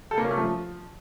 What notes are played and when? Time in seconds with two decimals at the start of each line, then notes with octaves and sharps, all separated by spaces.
0.11 A4
0.18 A#3
0.24 C#4
0.31 A3
0.37 F3